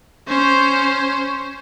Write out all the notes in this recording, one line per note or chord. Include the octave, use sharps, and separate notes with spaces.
C#4 C5